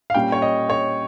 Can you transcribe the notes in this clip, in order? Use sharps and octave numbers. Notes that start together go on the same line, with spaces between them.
F5
A#2 G3 C#4 G5
C#5
D#5
C#5